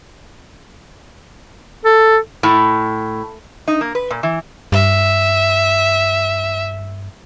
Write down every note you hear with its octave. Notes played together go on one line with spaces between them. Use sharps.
A4
A2
D#4
A#3
B4
A#2
E3
G2 E5